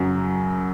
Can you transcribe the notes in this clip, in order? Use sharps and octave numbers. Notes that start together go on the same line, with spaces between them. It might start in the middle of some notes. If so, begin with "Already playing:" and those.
Already playing: F#2 C#3 F#3